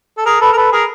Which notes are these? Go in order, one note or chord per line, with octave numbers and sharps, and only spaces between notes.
A4
G#4 A#4
A4 B4
A#4
A4 B4
G#4 A#4